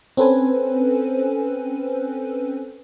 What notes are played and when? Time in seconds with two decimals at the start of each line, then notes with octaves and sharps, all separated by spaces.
0.17 C4 C#4 A4 B4 C5 G#5